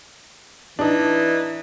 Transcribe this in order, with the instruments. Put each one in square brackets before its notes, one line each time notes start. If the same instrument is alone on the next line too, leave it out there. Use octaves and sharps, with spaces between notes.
[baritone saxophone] E3 [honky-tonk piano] D4 D#4